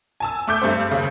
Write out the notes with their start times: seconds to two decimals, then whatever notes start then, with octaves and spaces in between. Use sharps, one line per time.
0.20 G#5 A5 E6
0.48 A3 D6 G6
0.62 G2 A3 C4
0.91 D#2 C#3